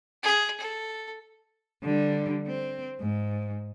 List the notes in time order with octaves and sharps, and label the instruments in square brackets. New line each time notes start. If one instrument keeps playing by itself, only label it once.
[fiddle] G#4
A4
[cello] D3 G3
C4
G#2